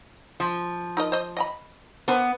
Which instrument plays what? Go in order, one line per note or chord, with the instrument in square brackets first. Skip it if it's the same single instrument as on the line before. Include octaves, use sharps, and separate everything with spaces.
[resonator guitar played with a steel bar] F3
[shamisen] D#4 A#4 D#5
C5 D#5
D#5 G#5 B5
[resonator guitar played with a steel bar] B3 [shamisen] D4 A#4 C5